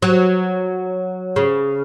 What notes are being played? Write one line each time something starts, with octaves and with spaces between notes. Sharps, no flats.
F#3
C#3